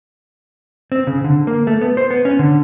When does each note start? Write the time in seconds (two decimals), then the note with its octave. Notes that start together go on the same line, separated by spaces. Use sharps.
0.92 C4
1.07 C#3
1.24 D3
1.47 A#3
1.67 A3
1.81 B3
1.97 C5
2.10 B3
2.25 C#4
2.39 D3